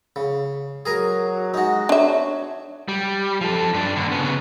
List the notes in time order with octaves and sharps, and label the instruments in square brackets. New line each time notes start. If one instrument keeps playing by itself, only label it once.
[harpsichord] C#3
[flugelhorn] F#3 [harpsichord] G#4 A#4 G#5
[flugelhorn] G#3 [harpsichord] D#4 F#4
[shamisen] D4 E5 [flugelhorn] C#5
[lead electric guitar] G3
F3 A4
G2 D4
D#2 D3
C#3 B3